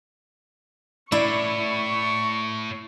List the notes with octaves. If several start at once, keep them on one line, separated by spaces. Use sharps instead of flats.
A2 E4 D5 C#6